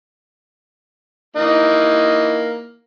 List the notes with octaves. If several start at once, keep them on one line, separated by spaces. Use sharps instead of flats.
E3 A#3 D#4